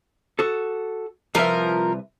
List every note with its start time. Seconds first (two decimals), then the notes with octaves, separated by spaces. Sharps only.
0.39 F#4 A4
1.35 C2 F3 A#4 B4 E5